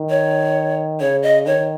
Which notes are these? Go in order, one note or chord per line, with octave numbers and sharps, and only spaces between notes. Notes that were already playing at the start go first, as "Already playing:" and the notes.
Already playing: D#3
C#5
C#3 C#5
D#5
D#3 C#5